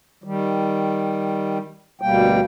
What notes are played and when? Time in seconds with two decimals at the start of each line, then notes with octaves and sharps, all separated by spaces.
0.24 D#3 G3
2.01 D2 B2 G3 A#3 G5